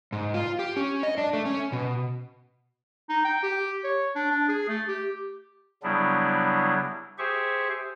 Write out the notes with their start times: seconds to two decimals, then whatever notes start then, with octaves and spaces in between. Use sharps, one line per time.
0.12 G#2
0.34 F4
0.59 G4
0.76 C#4
1.03 D#5
1.18 D4
1.33 A3
1.46 C#4
1.72 B2
3.09 D#4
3.25 G5
3.43 G4
3.84 C#5
4.15 D4
4.31 D4
4.48 G#4
4.68 A3
4.88 G4
5.83 C#3 F#3 G3 B3 D4 E4
7.18 G4 G#4 C5 E5 C#6